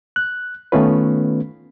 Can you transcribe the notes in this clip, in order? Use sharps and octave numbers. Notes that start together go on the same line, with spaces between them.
F#6
D#3 A3 B3 C#4 F4 B4